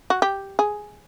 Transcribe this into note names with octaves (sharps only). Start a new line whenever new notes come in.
F#4
G4
G#4